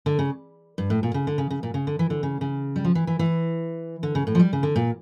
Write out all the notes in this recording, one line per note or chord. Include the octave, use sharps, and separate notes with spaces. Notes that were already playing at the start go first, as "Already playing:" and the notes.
D3
C#3
G2
A2
A#2
C#3
D3
C#3
C#3
A#2
C#3
D3
E3
D3
C#3
C#3
G3
F3
E3
E3
E3
D3
C#3
A2
F3
G3
C#3
D3
A#2